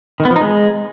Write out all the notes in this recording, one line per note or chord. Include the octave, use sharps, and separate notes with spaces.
D#3
B3
F3
D#4
G#3